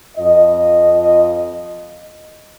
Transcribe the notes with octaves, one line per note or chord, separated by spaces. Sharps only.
F2 F4 D#5